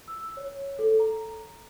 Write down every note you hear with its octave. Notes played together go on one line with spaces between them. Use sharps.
E6
C#5
A4
A#5